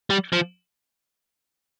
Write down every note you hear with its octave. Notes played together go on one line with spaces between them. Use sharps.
G3
F3